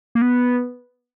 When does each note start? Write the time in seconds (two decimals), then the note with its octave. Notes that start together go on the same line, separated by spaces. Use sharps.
0.15 A#3
0.22 B3